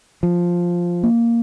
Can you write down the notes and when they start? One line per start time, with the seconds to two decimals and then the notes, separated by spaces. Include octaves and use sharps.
0.23 F3
1.03 A#3